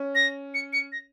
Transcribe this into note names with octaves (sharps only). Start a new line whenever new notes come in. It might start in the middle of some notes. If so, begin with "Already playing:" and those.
Already playing: C#4
A#6
C#7
C#7
A#6